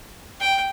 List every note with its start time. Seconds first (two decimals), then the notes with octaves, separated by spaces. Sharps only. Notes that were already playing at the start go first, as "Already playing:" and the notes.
0.40 G5